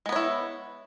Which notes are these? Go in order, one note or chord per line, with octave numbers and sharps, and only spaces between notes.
G#3 B3 E4 C#5